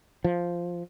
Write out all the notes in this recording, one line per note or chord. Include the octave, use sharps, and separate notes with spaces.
F3